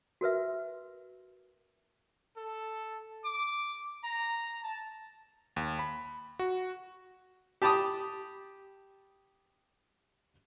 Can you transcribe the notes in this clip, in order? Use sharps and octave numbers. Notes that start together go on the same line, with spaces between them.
F#4 A#4 B4 E5
A4
D6
A#5
A5
D#2
B5
F#4
G4 A5 B5 D6 D#6